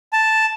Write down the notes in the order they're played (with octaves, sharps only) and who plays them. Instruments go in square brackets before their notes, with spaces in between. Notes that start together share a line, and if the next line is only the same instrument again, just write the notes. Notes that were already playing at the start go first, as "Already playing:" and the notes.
[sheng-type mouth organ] A5